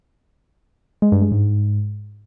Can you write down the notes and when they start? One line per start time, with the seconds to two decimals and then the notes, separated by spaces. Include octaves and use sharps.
1.02 G#3
1.12 G2
1.22 G#3
1.32 G#2